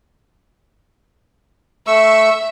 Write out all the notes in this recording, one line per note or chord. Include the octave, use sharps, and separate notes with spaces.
A3 E5 C#6 E6